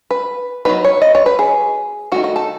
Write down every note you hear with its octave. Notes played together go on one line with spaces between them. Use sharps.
B4
F#3 B3 D#4 B4
C#5
D#5
C#5
B4
G#4
D#3 A3 D#4 F#4
F#4
A4